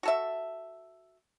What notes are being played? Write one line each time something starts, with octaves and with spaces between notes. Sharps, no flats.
F#4 A4 E5